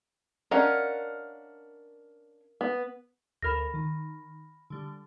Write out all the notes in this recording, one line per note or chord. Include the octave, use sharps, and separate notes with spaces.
C#4 D4 A#4 D#5 F5 F#5
B3
D2 A#4 B5 F6 A#6 E7
D#3
D3 G3